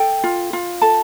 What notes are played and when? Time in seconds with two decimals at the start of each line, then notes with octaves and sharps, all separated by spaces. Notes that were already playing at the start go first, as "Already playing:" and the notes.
Already playing: A4 G5
0.24 F4
0.53 F4
0.81 A4 A5